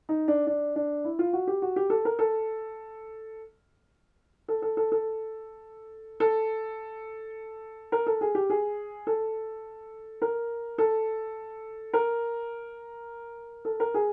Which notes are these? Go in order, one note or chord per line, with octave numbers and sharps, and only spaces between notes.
D#4
D4
D4
D4
E4
F4
F#4
G4
F#4
G4
A4
A#4
A4
A4
A4
A4
A4
A4
A#4
A4
G#4
G4
G#4
A4
A#4
A4
A#4
A4
A#4
G#4